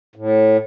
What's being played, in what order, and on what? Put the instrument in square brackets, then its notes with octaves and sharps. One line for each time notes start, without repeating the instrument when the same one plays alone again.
[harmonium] A2